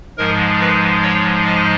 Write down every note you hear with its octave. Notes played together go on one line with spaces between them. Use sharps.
G#2 F3 G#3 A#4
B4
C#5
D#5